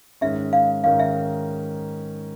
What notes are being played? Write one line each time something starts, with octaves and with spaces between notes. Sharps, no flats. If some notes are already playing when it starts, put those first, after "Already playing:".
G#2 D#3 G#3 C#4 E5
F5
G#2 D#3 G#3 C#4 F5
E5